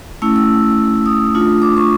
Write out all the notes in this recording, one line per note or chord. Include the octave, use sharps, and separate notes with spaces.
A3 C#4 E4 E6
E6
D#6
A3 D4 F4
D6
C#6